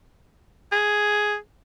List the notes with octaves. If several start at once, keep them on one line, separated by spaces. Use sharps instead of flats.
G#4